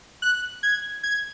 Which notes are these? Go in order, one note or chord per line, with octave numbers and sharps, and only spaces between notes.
F#6
G#6
G#6